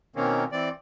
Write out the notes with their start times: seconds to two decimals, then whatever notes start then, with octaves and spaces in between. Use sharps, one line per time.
0.16 B2 D#3 A#3 C4 C#4
0.52 E3 C4 D5